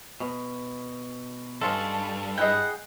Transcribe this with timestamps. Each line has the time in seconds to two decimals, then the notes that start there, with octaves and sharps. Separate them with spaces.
0.20 B2
1.61 G2 G#3 C#4 F4 A4
2.38 E4 G#4 D#5 F#5 G5